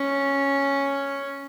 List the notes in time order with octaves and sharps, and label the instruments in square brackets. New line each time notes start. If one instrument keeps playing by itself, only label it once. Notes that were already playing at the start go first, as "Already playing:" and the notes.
Already playing: [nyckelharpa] C#4